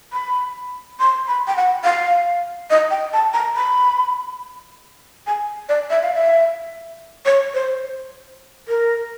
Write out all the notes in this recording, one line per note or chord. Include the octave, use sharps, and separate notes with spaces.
B5
C6
B5
G5
F#5
F5
D#5
G5
A5
A#5
B5
G#5
D5
E5
F5
E5
C#5
C5
A#4